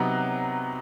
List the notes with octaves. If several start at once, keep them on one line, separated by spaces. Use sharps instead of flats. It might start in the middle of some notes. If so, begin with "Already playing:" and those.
Already playing: C3 F#3 B3 D#4 F#6